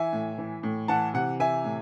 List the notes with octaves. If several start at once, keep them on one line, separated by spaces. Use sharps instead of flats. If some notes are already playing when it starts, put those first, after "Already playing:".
Already playing: E3 E5 G#5
A2
E3
A2
E3 F#5 A5
C3 F#5
E3 E5 G#5
A2